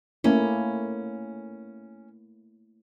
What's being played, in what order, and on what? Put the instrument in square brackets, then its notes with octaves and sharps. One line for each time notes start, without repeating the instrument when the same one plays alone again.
[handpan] A3 A#3 E4 [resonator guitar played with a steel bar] C#4